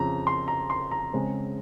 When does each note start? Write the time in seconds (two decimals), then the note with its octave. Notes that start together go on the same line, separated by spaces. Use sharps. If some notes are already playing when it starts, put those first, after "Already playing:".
Already playing: F2 C#3 F3 A#5
0.27 C6
0.48 A#5
0.70 C6
0.91 A#5
1.13 C#3 G#3 C4